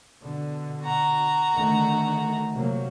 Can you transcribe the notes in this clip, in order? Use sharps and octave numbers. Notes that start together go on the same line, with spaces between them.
B2 D3
F#4 A#5
D3 D#3 A3
C3 F#3 A#3